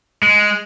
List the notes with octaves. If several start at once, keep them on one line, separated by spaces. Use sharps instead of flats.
G#3